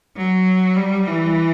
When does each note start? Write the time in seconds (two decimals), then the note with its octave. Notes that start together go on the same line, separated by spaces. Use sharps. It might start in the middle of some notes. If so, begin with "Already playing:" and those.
0.17 F#3
0.77 G3
1.07 E3